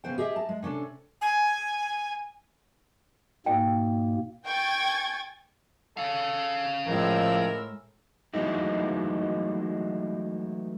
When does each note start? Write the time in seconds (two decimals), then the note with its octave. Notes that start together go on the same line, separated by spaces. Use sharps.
0.04 C#3 B3 C5 G5
0.18 G4 G#4 D#5 E5
0.36 A5 A#5
0.49 G#3
0.62 C3 C#4 D4 A4
1.21 G#5
3.46 G#2 B2 A#3 G5
4.46 G5 G#5 C#6 G#6 A6
5.97 C#4 A4 F5
6.86 A2 F3 G#3 A#4 E6
8.34 E3 F#3 G#3 A3 D#4 E4